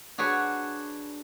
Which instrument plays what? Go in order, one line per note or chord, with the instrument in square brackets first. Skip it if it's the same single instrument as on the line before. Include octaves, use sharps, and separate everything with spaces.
[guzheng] D4 F#4 G#4 B4 C#5